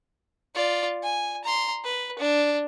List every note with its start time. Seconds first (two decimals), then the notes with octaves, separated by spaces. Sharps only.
0.55 F4 D5
1.03 G#5
1.44 A#5 C6
1.84 B4
2.19 D4